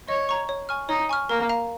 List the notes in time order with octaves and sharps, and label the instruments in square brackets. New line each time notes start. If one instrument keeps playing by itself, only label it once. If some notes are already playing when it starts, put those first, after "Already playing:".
[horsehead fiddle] C#5 [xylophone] D#5
[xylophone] A#5 C#6
C#5
G#5 C#6 F6
[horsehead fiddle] D#4 [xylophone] C#5
[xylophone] G#5 C#6 F6
[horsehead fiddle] A#3 [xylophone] A#4
[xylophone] F5 A#5